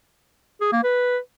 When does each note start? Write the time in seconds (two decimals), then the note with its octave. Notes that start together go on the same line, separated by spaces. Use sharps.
0.61 G#4
0.72 A#3
0.83 B4